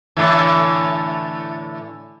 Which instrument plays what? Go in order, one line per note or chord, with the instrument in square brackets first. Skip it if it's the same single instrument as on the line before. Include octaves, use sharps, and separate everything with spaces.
[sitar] A2 D3 E3